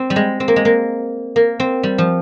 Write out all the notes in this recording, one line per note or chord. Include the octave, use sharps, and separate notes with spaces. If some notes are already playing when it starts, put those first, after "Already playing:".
Already playing: C4
G3
G#3
C4
A#3
G#3
A#3
A#3
C4
G3
F3